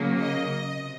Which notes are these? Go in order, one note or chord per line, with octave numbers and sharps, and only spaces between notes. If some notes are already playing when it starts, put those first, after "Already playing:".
Already playing: C#3 F#3 A#3
D#5
C3